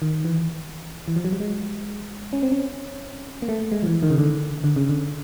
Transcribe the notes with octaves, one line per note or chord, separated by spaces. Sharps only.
D#3
E3
E3
F3
F#3
G3
G#3
C#4
C4
C#4
A#3
A3
G#3
F3
E3
D#3
C#3
D3
D3
C#3
D3